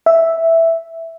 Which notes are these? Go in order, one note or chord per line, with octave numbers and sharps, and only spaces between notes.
E5